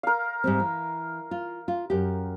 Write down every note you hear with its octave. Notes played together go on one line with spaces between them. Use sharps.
A#4 F5
G#2 G3 C4
E3
F4
F4
F#2 G4